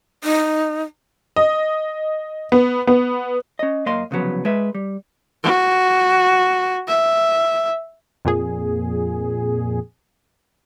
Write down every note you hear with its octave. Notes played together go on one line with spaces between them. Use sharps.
D#4
D#5
B3
B3
C#4 D#5
F#2 A#3 D#5 F5 C6
C2 C#3 F3 F#3 B3
G#3 B4 E5
G3
F#4
E5
F2 A#2 G#4